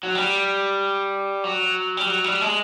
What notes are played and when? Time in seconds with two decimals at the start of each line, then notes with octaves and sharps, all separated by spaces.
0.03 F#3
0.15 G3
1.44 F#3
1.97 G3
2.08 F#3
2.24 G3
2.41 G#3